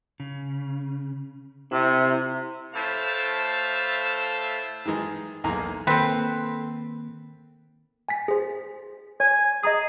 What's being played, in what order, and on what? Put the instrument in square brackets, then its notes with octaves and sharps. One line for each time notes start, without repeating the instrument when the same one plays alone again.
[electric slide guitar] C#3
[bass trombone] C3 [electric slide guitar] E4
[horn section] A2 A3 C5 E5 F5 A5
[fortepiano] D#3 E3 G#3 D#4 G#4
B1 E2 A#3 G#5 A#5
[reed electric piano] D#3 A#3 [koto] C4 C5 [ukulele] A4 G5 [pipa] B4
[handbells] G#5 A6 B6
G#4 C5
[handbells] C#5 [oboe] G#5
[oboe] G#4 [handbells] D#5 A#5 D#6